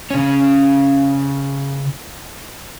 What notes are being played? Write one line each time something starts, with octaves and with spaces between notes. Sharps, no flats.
C#3 C#4